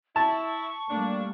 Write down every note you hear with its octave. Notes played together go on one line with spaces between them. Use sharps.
E4 A5 C#6
G3 A3 A#3 D4